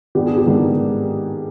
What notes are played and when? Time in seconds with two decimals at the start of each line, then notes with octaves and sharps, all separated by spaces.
0.15 G#2 D#3 G#3 B3 D4 G4
0.26 G#4
0.38 G4
0.46 G#2 D#3 G#3 B3 D4